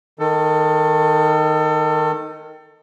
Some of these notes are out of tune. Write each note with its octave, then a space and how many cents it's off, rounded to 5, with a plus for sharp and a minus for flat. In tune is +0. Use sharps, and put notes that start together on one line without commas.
D#3 +0 A4 +25